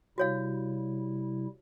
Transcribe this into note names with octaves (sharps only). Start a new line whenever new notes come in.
C3 G3 E4 F#4 C#5 F5